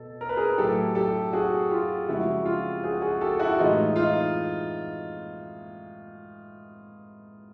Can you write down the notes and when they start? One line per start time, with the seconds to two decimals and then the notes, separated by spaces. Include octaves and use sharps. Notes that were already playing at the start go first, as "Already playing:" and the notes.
Already playing: B2 A4
0.21 A#4
0.29 B4
0.37 G#4 A#4
0.58 A2 F#3 G4 A4
0.95 G4 A4
1.33 F#4 G#4
1.70 F4 G4
2.08 C#3 F3 G#3 E4 F#4
2.45 F4 G4
2.83 F#4 G#4
3.02 F#4 G#4
3.21 G4 A4
3.39 E4 F#4
3.59 A2 E3 G#3 D#4 F4
3.96 D#4 F4